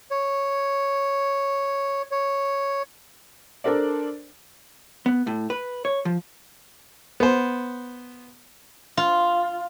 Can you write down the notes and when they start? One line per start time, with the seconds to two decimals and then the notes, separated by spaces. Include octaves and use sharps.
0.11 C#5
2.11 C#5
3.64 D4 A4 A#4 C5 D5
5.06 B3
5.27 A2
5.50 B4
5.85 C#5
6.05 F3
7.20 B3 C5
8.97 F4